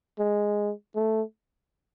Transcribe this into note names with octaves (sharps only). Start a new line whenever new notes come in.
G#3
A3